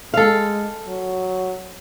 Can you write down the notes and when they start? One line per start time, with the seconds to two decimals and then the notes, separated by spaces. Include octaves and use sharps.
0.14 G#3 A4 F5
0.88 F#3